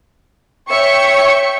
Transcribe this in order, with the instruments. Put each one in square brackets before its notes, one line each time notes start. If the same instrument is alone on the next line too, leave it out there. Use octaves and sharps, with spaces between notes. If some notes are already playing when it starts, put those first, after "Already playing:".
[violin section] C#5 E5 G5 C#6 C#7